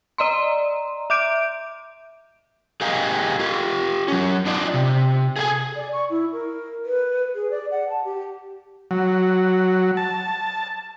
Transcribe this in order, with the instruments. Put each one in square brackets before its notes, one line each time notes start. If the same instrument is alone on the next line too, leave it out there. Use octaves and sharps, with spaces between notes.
[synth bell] D5 D#5 A#5 C6
E5 D6 G6 D7
[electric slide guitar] G4 G#4 A#4 D#5 F5 G#5
F4 G4
F#3 C#4
D4 D#4 F4 D5
C3
G#4 A4 F5 G#5
[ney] D5
C#6
E4
A#4
B4
G#4
D5
F#5
A5
G4
[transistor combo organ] F#3
A5